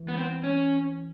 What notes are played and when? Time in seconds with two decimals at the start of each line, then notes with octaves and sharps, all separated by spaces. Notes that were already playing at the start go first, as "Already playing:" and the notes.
Already playing: E3
0.09 B3
0.17 C4
0.44 C#4